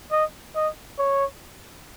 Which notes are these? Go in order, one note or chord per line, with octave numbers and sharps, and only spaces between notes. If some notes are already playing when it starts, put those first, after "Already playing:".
D#5
D#5
C#5